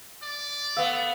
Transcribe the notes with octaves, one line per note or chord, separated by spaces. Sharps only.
D5
A3 B3 F5 E6